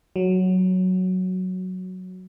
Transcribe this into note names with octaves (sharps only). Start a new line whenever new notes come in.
F#3